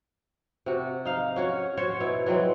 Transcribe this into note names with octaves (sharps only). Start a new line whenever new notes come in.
C3 F#4
D#4 F5
C#4 F#4 C#5
F#4 C5 C#5
B2 E4 C#5
E3 F#3 G#3 C4